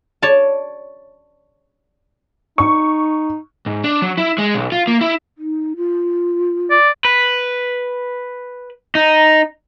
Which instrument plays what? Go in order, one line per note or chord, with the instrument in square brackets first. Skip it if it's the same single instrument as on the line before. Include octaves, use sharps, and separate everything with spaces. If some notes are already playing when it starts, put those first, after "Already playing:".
[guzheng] C#5 D5 A5
[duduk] D#4 [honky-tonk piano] C#6
[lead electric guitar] G#2
D4
F#3
E4
G#3
B1
F4
A#3
E4
[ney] D#4
F4
[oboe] D5
[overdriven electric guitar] B4
D#4